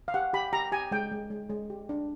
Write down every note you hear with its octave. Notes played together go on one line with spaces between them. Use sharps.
F5
G4 F#5
G4 B5
G4 A#5
G4 G#5
G#3 G5
G#3
G#3
G#3
G4
D4